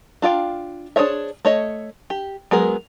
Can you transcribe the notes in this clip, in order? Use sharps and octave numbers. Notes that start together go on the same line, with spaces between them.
D4 F4 F5 G5
D4 G#4 C5 C#5 E5
A3 C#5 D#5
G4
F#3 G#3 B3 G#4 A#4